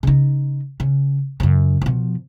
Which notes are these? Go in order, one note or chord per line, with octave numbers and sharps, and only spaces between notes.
C#3 D#4
C#3
F#2 C#3
B2 F3